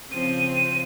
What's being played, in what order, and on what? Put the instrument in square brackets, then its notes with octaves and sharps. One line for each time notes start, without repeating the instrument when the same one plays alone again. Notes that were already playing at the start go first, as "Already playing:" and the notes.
[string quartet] C#3 F3 C4 [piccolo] D#7